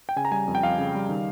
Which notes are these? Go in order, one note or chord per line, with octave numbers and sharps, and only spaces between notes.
G5
C#3 G#5
A#5
G3 G#5
F2
G5
F2 F5
C#3
G3
D#3